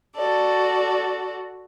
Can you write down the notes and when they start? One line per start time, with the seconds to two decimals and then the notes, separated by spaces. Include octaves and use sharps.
0.14 F#4 A4 D5